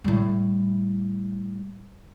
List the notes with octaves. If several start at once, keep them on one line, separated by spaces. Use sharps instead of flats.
A2 G3